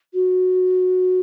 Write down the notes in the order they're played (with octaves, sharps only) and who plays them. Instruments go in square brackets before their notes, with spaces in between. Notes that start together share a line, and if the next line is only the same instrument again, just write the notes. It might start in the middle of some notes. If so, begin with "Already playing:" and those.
[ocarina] F#4